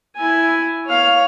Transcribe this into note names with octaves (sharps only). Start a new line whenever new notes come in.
E4 G#5
C#5 F5